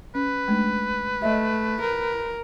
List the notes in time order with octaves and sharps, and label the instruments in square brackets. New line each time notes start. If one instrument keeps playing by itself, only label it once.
[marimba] C#4 [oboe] B4
[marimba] G#3 A3 D4
[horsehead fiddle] A3 [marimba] D#5 E5
[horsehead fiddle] A#4